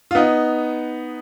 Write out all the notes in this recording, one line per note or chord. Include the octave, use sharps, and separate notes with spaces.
F4
B3 D#4